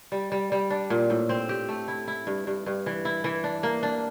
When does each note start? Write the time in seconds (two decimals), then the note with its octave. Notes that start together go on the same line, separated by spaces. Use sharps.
0.12 G3
0.32 G3
0.52 G3
0.70 D4
0.90 A#2
1.10 A2
1.29 C4
1.49 G4
1.69 A3
1.88 E4
2.08 E4
2.27 G2
2.47 G2
2.66 G2
2.86 E3
3.05 E4
3.24 E3
3.44 D4
3.63 A#3
3.83 D4